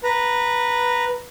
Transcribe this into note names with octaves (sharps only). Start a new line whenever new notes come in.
B4 A#5